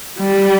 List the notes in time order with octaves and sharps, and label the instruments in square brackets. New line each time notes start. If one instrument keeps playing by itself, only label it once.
[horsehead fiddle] G3